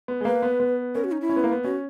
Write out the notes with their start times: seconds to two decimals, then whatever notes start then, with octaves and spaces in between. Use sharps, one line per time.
0.08 B3
0.21 G#3
0.25 A#3 B4
0.42 B3
0.60 B3
0.95 C#4 A#4
1.04 F#4
1.12 D#4
1.21 E4
1.29 C#4
1.36 B3
1.44 A#3
1.51 B3
1.64 C#4 F#4